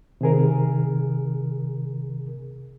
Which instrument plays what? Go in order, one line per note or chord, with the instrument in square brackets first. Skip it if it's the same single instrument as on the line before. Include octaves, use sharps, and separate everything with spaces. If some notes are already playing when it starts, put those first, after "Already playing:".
[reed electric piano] C3 D#3 G#4 A#4